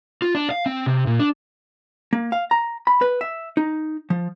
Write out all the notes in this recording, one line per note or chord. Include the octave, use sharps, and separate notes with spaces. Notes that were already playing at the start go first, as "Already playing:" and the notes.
F4
D4
F5
C4
C3
A#2
D4
A#3
F5
A#5
B5
B4
E5
D#4
F3